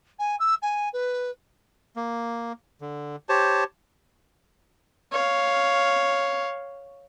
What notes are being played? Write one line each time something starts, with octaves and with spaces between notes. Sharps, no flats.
G#5
E6
G#5
B4
A#3
D3
G4 C5 C#5 A5
C#5 F5